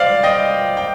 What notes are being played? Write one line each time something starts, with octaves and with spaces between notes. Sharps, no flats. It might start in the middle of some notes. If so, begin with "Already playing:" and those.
Already playing: C5 D5 F5
D#5 G5
G5